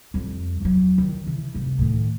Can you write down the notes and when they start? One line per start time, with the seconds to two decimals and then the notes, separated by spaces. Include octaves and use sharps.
0.14 F2 G3
0.61 E2 F#3
0.98 D#3
1.26 C#3 E3
1.54 F1 G3
1.79 A2 D#3